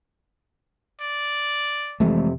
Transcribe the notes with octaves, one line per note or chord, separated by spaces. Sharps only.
D5
F2 C3 E3 G#3 A3